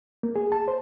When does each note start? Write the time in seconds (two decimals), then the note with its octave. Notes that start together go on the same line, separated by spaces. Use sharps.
0.23 A#3
0.36 G#4
0.52 A5
0.68 C5